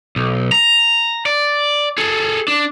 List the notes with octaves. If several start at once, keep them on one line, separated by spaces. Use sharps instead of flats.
B1
A#5
D5
G#4 A4
D4